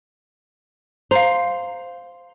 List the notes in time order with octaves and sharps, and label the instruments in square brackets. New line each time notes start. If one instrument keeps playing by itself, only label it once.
[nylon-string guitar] C5 [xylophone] F5 A#5